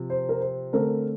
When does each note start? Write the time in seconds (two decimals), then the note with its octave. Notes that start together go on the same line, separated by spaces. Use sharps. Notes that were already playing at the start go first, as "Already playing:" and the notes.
Already playing: C3 F3
0.10 C5
0.29 A#4
0.41 C5
0.73 D3 A3 C4 A#4